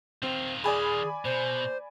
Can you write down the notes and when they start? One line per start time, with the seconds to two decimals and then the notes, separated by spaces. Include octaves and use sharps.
0.22 D#3 C4 F4
0.64 G#4 D5 G#5 B5
1.25 B2 C5